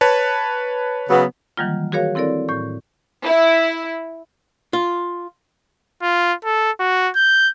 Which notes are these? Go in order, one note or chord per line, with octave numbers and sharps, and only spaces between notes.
B4 C#5 A5
C#3 F#3 B3
D#3 E3 F#3 G3 A#3 F4
F#4 G#4 A#4 C#5 F5
C4 E4 A4 A#4 D5
A2 G6
E4
F4
F4
A4
F#4
G6